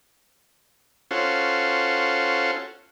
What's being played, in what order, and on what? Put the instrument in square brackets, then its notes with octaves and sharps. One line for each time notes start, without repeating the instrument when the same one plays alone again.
[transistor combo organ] C#4 F4 F#4 A4 C5